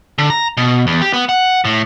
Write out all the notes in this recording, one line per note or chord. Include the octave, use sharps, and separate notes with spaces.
D3
A#5
B2
E2
G4
B3
F#5
A2